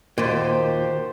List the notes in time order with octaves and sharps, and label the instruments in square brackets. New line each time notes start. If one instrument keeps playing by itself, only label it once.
[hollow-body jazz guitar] D#2 A#2 [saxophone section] F#4 G4 C5